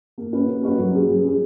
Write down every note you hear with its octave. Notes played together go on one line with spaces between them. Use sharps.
A#3
C#4 F#4 B4
A#3
C#4 F#4 B4
F#3
C#4 G#4
F#3
C#4 G#4